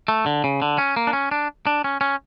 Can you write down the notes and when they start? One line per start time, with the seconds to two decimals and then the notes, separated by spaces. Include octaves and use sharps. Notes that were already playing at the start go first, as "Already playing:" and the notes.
0.08 A3
0.26 D3
0.44 C#3
0.62 D3
0.78 C#4
0.96 A#3
1.07 D4
1.13 C#4
1.31 D4
1.67 D4
1.84 C#4
2.01 C#4